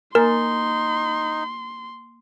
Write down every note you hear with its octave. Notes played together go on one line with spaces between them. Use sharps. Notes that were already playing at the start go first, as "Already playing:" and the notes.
A#3 D#4 A#4 G#5 C6 A6